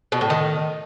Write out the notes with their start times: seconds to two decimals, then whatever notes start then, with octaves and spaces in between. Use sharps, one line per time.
0.12 B2
0.21 A2
0.30 D#3